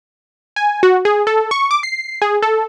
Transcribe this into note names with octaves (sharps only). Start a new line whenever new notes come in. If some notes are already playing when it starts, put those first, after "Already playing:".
G#5
F#4
G#4
A4
C#6
D6
C7
G#4
A4